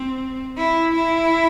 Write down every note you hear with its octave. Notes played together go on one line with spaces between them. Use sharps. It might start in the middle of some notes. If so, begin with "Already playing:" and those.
Already playing: C4
E4
E4